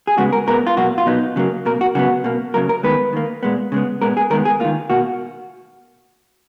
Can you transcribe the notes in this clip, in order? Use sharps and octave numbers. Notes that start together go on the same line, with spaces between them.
G#4
C#3 G#3 B3 F#4
A#4
B2 G#3 B3 A#4
F4
B2 F#3 A#3 F#4
F4
B2 F#3 B3 D#4
C#3 F#3 A#3
B2 A#3 A#4
F#4
C#3 F#3 B3 F#4
B2 A#3
C#3 F#3 A#3 A#4
A#4
D#3 G#3 B3 B4
D#3 A#3
A#2 G#3 B3
C#3 G#3 B3
A#2 G#3 B3 A#4
G#4
D#3 G#3 B3 A#4
G#4
D#3 A#3 F4
B2 A#3 F#4